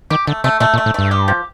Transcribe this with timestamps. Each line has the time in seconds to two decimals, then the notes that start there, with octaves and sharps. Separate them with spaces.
0.10 D#3 G4
0.27 D3 A3
0.44 C3 A3
0.60 A#2 A3
0.74 A#2
0.78 A3
0.86 A2
0.94 G2 A3
1.11 G4
1.28 F3